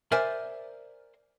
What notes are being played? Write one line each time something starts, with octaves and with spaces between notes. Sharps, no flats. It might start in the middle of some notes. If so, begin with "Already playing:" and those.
A#4 C5 D5 E5 G#5